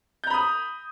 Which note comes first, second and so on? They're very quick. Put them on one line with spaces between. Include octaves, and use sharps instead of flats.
G6 A#5 B5 D#6